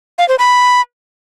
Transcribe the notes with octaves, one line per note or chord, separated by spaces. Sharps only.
F5
C5
B5